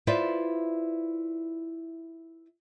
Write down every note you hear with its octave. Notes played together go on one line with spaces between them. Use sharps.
E4 F4 B4 C5 D5 E5